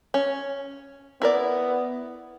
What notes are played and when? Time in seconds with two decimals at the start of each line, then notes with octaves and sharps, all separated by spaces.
0.14 C#4
1.22 B3 E4 A#4 D5